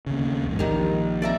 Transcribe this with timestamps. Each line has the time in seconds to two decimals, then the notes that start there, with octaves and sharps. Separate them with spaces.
0.06 D#2 C#3
0.47 B1 E2 G#2
0.59 A#1 D#3 G3 A#5
1.22 D5 E5 A#5